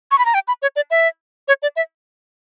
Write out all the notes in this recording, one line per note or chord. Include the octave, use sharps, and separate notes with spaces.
C#6
B5
A#5
G5
B5
C#5
D5
E5
C#5
D5
E5